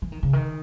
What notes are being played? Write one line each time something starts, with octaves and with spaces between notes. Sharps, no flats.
E3
D#3
C#3
D#3